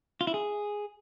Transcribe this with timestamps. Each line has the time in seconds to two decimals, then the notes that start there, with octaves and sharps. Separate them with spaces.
0.21 F4
0.27 E4
0.34 G#4